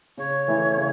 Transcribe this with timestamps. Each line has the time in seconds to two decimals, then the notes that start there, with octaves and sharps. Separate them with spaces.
0.17 C#3 C#5
0.48 E3 A3 E4
0.77 C#3